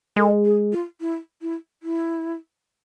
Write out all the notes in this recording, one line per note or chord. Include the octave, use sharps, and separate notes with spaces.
G#3 A4
G#4
F4
E4
E4
E4